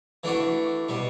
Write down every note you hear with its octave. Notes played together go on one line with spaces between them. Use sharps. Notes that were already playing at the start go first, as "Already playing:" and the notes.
E3 A3 D4 F#4
B2 G3